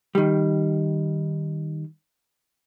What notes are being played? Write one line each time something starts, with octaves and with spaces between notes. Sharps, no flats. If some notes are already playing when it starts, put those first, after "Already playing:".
D#3 G3